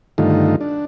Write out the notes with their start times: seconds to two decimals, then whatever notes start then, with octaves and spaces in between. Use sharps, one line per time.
0.18 G2 D3 D#3 A3 D#4 F4
0.61 D4